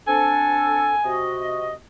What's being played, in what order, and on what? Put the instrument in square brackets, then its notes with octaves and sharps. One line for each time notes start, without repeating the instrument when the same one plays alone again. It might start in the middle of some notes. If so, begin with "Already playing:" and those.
[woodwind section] C4 D4 A4 [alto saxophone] G#5
[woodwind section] C3 F#4 D#5